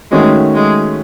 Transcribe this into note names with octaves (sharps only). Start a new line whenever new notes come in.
D#3 G#3 A3 C#4 F#4
G#3